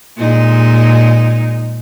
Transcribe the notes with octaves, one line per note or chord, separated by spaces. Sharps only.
A#2 G#3 D#4